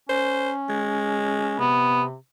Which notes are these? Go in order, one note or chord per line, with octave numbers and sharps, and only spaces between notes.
C#4 C5
G#3
C3 B3